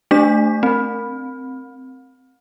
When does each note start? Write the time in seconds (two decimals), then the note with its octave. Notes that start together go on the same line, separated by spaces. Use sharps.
0.11 A3 D4 B6
0.63 C4